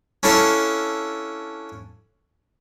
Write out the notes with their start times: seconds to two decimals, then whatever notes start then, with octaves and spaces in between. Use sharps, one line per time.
0.23 C#4 D4 E4 A4 F5 A5